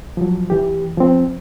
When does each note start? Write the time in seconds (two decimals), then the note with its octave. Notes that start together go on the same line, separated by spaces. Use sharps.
0.17 F3 F#3
0.50 E3 G4
0.97 F3 C4